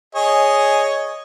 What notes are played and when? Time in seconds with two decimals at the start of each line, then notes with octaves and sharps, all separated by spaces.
0.15 G#4 C#5 D#5